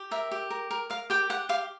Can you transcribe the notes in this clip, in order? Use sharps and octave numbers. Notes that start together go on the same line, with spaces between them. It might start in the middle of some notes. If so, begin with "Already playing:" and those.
Already playing: G4
A#4 E5
G4
A#4
A#4
A#4 F5
G4 G5
G4 F#5
G4 F5